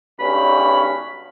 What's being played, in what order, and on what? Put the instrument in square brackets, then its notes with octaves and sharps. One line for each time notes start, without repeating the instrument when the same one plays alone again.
[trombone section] B1 G2 C#4 [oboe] B5